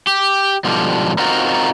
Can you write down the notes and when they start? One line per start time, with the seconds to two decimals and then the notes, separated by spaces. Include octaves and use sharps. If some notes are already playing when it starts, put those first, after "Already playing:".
0.07 G4
0.64 G#2 B2 D3 F3 G3
1.19 C4 D#4 F4 F#4 A#4